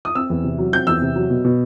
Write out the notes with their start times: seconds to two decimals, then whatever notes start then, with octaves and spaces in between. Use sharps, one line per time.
0.05 D#6
0.15 C4 E6
0.30 E2
0.44 C3
0.58 F#3
0.73 C4 G6
0.87 E2 E6
1.02 C3
1.16 F#3
1.30 B2
1.45 B2